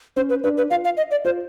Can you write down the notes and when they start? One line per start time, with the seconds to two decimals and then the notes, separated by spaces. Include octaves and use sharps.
0.16 C#4 C5
0.29 B4
0.44 D4 B4
0.57 B4
0.70 F4 F5
0.85 F5
0.97 D#5
1.11 D5
1.25 F4 C5